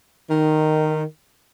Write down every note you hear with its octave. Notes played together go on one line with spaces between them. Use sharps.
D#3